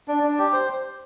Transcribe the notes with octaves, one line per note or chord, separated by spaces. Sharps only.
D4
D4
G4
C5